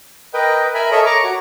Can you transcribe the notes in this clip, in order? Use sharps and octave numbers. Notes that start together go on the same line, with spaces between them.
A#4 B4 D#5 G5
A#4 E5 G#5 B5
A4 A#4 C#5 D#5 E5
A#5 C#6 D6
F#4 C#5